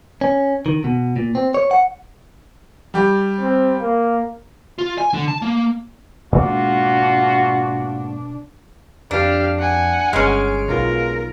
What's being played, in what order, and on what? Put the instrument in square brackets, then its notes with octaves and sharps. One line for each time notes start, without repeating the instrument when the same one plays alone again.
[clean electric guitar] C#4
D#3
B2
A#2
C4
C#5
F#5
[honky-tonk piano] G3 G4
[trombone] C4
A#3
[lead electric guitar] F4
G#5
D3
A5
A#3
[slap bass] G#2 A#3 [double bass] B2 D4 [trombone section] F4 F#4
[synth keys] F2 [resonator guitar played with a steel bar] D4 [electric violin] G4 F5
[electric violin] F#5 G#5
[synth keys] G1 F6 D7 [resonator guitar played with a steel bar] G#3 C#4
[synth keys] B1 F4 [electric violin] A#4